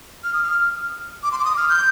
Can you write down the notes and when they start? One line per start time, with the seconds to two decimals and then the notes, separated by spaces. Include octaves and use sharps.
0.24 F6
0.33 D#6
0.42 F6
1.23 D6
1.32 C6
1.39 D6
1.45 D#6
1.57 F6
1.69 G6